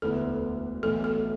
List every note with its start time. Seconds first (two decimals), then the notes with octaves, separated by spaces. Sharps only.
0.02 E1 D2 D3 B3 E4 A4
0.83 B1 A2 E3 A4
1.04 A4